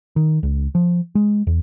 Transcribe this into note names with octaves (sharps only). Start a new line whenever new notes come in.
D#3
C#2
F3
G#3
E2